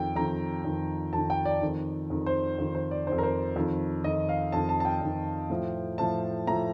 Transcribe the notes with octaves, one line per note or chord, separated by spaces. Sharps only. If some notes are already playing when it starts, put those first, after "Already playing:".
Already playing: F2 D#3 G5
F2 D#3 A#5
F2 D#3
F2 D#3 A5
G5
D5
F2 D#3
F2 D#3
C5
F2 D#3
C5
D5
F2 D#3 C5
A#4
C5
F2 D#3
F2 D#3 D#5
F5
F2 D#3 A5
A5
A5
G5
F2 D#3
A2 F3
A2 F3 A5
A2 F3 A#5